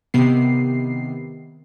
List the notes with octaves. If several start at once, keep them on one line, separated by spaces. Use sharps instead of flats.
C3 D#3 B3 C7